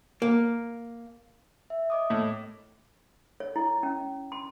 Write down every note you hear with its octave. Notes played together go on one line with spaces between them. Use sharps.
A#3
E5
D#5 D6 D#6
A2 A#3
C#5
E4
C#4
C6